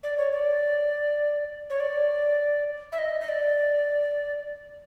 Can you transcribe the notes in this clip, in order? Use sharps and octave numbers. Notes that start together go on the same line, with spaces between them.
D5
C#5
D5
C#5
D5
E5
D#5
D#5
D5